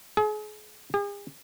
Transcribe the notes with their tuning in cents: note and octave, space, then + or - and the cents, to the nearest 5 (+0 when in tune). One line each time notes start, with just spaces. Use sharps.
G#4 +35
G#4 -45